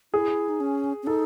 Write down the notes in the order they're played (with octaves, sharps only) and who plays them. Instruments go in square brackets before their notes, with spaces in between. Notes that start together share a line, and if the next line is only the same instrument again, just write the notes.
[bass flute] E4 [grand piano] G#4
[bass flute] D#4
C#4
C#4
[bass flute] D#4 [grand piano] A4